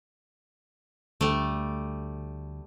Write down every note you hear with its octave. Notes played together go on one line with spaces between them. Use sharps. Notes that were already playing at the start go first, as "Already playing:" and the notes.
D2 G3 A3